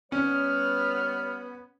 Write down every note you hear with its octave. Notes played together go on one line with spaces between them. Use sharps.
G3 B3 C#4 C#5 F6